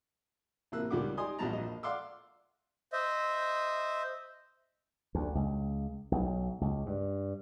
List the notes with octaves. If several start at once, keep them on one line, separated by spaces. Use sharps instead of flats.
A1 C3 A#3 E6 F#6
C#2 D#3 G3 B3 D6
D#4 G4 D5 G#5 C6 D#6
A#1 E2 B2 G3 A5 A#5
A#1 D#5
D5 F5 F#5 C6 D6 E6
C5 D#5 E5
D2
C#2
B1
C#2
G2